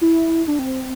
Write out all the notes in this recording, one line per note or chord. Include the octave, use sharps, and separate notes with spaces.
E4
D4
C4